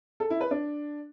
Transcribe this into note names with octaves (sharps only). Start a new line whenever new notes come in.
A4
E4
B4
D4